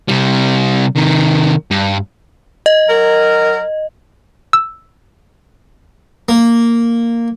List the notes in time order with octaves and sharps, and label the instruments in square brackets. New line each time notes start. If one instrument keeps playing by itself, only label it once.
[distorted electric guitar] C3 G3
C3 D#3
G2
[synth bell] D#5
[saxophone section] F#3 A#4
[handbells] E6
[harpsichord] A#3